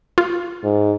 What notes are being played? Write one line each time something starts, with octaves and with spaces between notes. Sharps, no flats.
F4
G#2